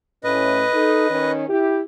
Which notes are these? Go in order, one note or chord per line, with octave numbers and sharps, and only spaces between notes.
A2 C#4 B4 D#5
D#4 A4
D#3 C#4 D#4
E4 G4